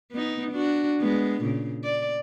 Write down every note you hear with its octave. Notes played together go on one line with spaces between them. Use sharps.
B3 D#4
D4 F#4
G#3 B3
A#2 C#3
D5